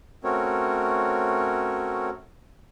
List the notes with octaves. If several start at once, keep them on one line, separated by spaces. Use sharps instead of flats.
A3 C4 C#4 F#4 A#4 C#5